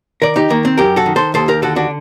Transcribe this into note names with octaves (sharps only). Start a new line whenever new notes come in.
D#3 A#4 D5
D#4 G4
D#3 A#3
C4
F#2 G4 A#4
F#4 A4
D#3
A4 C5
D#2 A4 C5
G4 A#4
D3 F#4 A4
D4 F#4